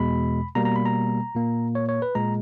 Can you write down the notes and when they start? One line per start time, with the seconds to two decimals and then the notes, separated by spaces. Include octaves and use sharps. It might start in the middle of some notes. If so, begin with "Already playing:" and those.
Already playing: E2 B2 G#3 B5
0.55 B2 G3 A#3 A#5
0.65 A#5
0.76 B5
0.86 A#5
1.35 A#2 A#3
1.75 C#5
1.89 C#5
2.02 B4
2.15 A#2 G#3 A#5